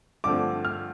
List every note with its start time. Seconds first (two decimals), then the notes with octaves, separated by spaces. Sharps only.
0.24 G2 D3 F3 A3 C4 D6
0.65 F6